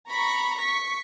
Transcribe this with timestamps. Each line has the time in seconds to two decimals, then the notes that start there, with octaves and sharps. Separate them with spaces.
0.11 A#5 B5 C#6
0.59 C#6 B6